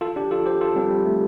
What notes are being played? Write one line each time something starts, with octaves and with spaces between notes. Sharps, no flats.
F4 A4
D4 G4
F4 A4
G4 C5
F4 A4
G3 C4
G3
A3